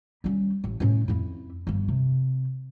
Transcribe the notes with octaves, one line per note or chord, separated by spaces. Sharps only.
G3 C#4
A1
A2 C#4
F2 E4
G1 F2
C3